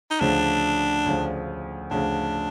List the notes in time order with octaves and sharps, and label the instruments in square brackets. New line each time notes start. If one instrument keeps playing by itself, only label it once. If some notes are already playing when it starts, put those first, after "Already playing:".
[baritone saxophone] D#4
[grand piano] D2 C#3 F3 [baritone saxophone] D4
[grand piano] D2 C#3 F3
[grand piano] D2 C#3 F3 [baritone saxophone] D4